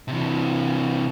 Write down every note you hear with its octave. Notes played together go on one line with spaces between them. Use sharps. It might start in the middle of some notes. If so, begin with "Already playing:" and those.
C3 E3